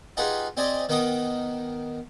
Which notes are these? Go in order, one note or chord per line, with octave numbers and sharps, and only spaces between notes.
D#4 F4 G4 G#4 B4 F#5
C4 G4 D5 D#5 G#5
D#3 B3 D#4 G5 D#6